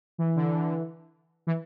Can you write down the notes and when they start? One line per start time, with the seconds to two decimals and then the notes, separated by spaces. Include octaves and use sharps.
0.18 E3
0.36 D3
0.55 E3
1.47 E3